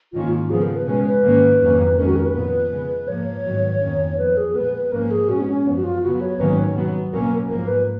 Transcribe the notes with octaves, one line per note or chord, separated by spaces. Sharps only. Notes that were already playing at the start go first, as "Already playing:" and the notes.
G#2 D#3 A#3 C#4 F4
F4
C#3 F3 B3 G#4
A#4
B4
B2 G#3 C#4 B4
B4
G#2 D#3 A#3 C#4
F2 D#3 F#3 A#3 C#4
F2 D#3 G#3 C#4 A#4
F#4
A#4
B4
A#2 F3 B3
C#3 G#3 B3
G#2 F3 A#3 C#5
G#2 D#3 F#3 B3
F2 D#3 A#3 C#4
F#2 F3 B3 B4
G#4
A#2 G#3 B3 B4
B4
G#2 F3 A#3 C#4 A#4
G#4
A#2 G#3 C#4 F#4
B3
C#4
F#2 F3 B3
F#4
F4
C#3 F#3 B3 F#4
C#5
G#2 D#3 F#3 A#3 C#4 B4
C#5
B2 F#3 B3
B2 F#3 A#3 C#4 A#4
G#2 F3 A#3 A#4
B4